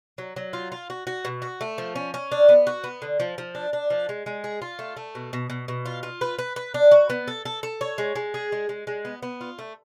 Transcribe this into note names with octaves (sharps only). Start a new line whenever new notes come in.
F#3
F#3
F4
F4
F#4
F#4
B2
F#4
A3
F3
C#4
C#4
D4
B3
F#4
B3
D3
F3
F3
D4
D4
F3
G#3
G#3
G#4
F4
A3
A3
B2
B2
B2
B2
F4
F4
B4
B4
B4
D4
F#4
B3
A4
A4
A4
C#5
G#3
G#3
G#4
G#3
G#3
G#3
B3
B3
F4
A3